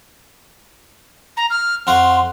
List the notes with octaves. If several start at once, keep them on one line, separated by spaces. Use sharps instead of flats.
A#5
F6
F2 F#4 F5 C6